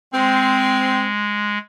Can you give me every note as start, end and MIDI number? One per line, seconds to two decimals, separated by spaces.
0.13 1.58 56
0.13 1.06 60